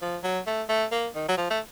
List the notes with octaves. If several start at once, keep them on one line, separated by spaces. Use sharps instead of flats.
F3
F#3
A3
A3
A#3
D#3
F#3
F3
A3